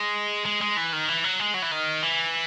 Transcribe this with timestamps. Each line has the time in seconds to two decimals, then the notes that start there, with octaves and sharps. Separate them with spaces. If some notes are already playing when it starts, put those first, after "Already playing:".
Already playing: G#3
0.46 G#3
0.61 G#3
0.77 E3
0.93 D#3
1.08 E3
1.24 F#3
1.40 G#3
1.54 F#3
1.62 E3
1.71 D#3
2.03 E3